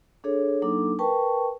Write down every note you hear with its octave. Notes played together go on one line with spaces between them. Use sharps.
D4 G#4 A4 C#5
F#3 A#3 D4 D#4 A4 D6
A#4 B4 G5 A5 C#6